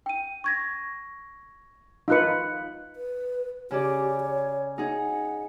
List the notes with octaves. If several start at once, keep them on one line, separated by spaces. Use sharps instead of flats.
G5 D#7
C#6 G#6 A#6
D#4 F4 B4 F5 F#6 C#7
B4
C#3 G4 G#4 D5
C#5
D#4 G#4 F#5